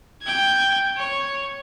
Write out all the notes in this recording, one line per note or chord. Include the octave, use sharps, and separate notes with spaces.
G5 G#6
C#5